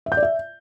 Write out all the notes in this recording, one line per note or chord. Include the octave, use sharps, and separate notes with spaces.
E5
G6
D5
E5